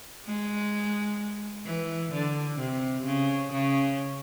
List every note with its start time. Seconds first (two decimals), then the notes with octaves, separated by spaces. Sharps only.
0.26 G#3
1.65 E3
2.12 D3
2.59 C3
3.05 C#3
3.53 C#3